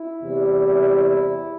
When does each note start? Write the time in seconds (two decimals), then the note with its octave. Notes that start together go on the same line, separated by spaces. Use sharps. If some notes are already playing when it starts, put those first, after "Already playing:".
Already playing: E4
0.22 E2 C3 G3